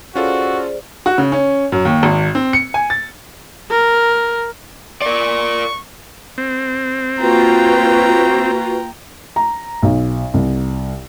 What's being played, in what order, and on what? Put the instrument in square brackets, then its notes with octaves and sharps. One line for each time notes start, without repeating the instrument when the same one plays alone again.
[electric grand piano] C#4 F4 A4 [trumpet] F#4 [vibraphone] G#4 C5 D5
[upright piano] F#4
C#3
C#4
F#2
D#2
G#1
C4
C#7
G#5
A6
[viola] A#4
[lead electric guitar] A#4 D5 [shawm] C#6
[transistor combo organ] C4
[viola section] A#3 F4 [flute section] F#4 B4 [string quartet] G5 A#5
[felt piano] A#5
B1
C2